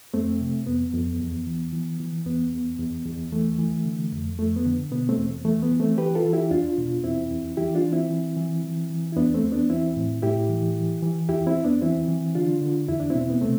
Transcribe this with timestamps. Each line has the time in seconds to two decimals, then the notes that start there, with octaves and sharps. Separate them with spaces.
0.14 F2 A3 C4
0.41 C3
0.67 F2 B3
0.94 F2
1.20 E2
1.47 E3
1.73 E3
2.00 E3
2.26 E2 B3
2.53 E2
2.79 E2
3.06 E2
3.32 E3 A3
3.59 E3
3.85 D3
4.12 F2
4.39 F2 A3
4.56 B3
4.65 D3
4.91 B2 B3
5.09 A3 C4
5.18 E2
5.45 E3 A3
5.62 B3
5.72 E3
5.80 A3 C4
5.98 E3 G4 B4
6.15 F4 A4
6.24 E3
6.33 E4 G4
6.51 E2 D4 F4
6.78 B2
7.04 E2 C4 E4
7.31 E2
7.57 E3 E4 G4
7.75 D4 F4
7.84 E3
7.93 C4 E4
8.10 E3
8.37 E3
8.64 E3
8.90 E3
9.12 E4
9.16 E2 B3 D4
9.34 A3 C4
9.43 E2
9.52 B3 D4
9.69 E3 C4 E4
9.96 A2
10.23 A2 E4 G4
10.49 E3
10.76 E3
11.02 E3
11.29 E2 E4 G4
11.47 C4 E4
11.56 E2
11.64 B3 D4
11.82 E3 C4 E4
12.08 E3
12.35 D3 D4 F4
12.62 D3
12.88 E2 E4
13.00 D4
13.10 B2 C4 E4
13.30 B3
13.41 C3 A3 C4